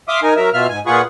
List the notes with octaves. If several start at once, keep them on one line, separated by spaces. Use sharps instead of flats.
E5 F5 C6 D6 D#6
D#4 A#4 G#5
F#3 A#4 E5
B2 F4 E5 F6
G#2 G#5
A#2 F4 G#4 B4 F#5 C#6